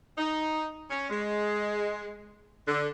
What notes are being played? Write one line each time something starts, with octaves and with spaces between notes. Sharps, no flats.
D#4
C#4
G#3
D3